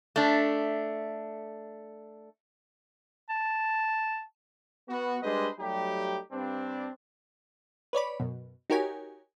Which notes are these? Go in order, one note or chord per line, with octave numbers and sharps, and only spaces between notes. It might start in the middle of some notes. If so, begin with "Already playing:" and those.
A3 D4
A5
B3 F#4
G3 G#3 D4 B4 C5 D#5
F#3 G3 A3 D#4 G4
G2 C4 D4
B4 C#5 D5 B5
F#2 B2
D#4 F#4 G4 A#4 C#5 G#5